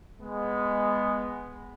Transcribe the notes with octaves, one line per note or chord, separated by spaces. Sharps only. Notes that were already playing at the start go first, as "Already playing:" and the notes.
G#3 B3